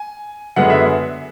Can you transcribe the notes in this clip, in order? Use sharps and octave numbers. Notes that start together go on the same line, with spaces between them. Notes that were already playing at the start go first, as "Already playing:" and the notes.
Already playing: G#5
F#2 D3 G#3 B3 F#5
E5